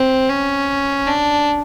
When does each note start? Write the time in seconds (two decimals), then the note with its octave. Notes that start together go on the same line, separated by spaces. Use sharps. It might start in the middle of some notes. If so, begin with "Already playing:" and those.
Already playing: C4
0.30 C#4
1.07 D4